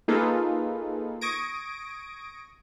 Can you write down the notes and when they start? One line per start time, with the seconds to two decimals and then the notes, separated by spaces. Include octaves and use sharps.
0.08 A#3 D#4 F4 G#4 A4 B4
1.21 C#6 D#6 G#6 A#6 D7